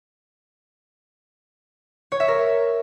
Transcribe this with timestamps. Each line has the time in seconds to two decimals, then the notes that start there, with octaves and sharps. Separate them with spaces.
2.12 C#5
2.20 E5
2.28 A#4